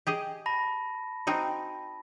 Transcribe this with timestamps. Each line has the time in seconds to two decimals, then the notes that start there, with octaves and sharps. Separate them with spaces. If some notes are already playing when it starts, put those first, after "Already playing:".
0.07 G4 G#4 D#5
0.46 A5 B5 A#6
1.27 C4 D#4 F#4